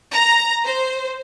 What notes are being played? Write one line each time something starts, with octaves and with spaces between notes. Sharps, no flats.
A#5
C5